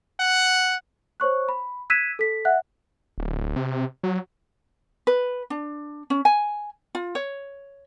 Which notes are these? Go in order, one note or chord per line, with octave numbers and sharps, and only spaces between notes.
F#5
C5 C#5 C#6 F#6
B5
E6 F#6 G#6 B6 D#7 E7
A4 B6
E5 F#5 F#6
D1
C3
F#3
B4
D4
C#4
G#5
F4
C#5